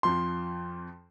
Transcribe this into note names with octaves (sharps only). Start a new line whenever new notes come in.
F2 F3 C6